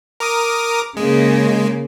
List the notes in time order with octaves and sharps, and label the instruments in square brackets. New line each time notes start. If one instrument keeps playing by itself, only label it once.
[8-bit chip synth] A#4 D6 D#6
[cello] C#3 A#3 [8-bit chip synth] G#3